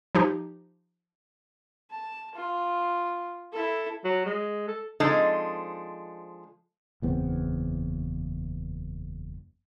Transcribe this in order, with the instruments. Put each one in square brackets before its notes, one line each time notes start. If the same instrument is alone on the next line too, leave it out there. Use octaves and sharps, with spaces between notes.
[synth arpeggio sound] F3 D#4 G4
[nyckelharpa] A5
F4
E4 A4
[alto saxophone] F#3
G#3
A4
[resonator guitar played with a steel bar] F3 G#3 C4 D4 D#4 A4
[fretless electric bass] F#1 E2 B3 C4